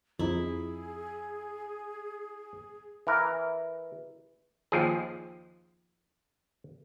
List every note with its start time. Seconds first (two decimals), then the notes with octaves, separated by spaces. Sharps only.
0.19 F2 D#4 E4 G#4
3.07 E3 A#4
4.72 D#2 F3 G#4